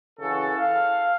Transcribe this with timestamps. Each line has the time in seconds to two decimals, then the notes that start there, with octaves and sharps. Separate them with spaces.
0.20 C#3 E3 F#4 A4
0.58 F5